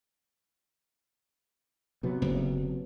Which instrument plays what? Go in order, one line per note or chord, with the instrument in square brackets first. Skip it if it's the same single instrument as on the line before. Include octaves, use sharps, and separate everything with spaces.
[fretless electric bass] C3 F#3 B3
[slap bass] F#1